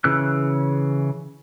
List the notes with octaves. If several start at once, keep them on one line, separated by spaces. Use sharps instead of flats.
C#3 E3 E6 F#6